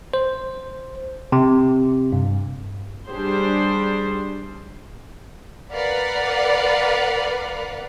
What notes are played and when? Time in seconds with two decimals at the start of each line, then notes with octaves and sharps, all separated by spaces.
0.14 C5
1.32 C3
2.13 G2
3.08 G3 D4 G4 G#4 C5
5.73 A#4 B4 D5 F5 F#5 B5